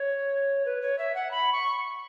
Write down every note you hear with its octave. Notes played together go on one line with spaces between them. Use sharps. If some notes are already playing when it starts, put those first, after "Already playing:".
Already playing: C#5
B4
C#5
E5
F#5
B5
C#6